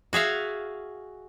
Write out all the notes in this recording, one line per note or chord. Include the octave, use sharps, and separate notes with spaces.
F#4 G#4 E5 F5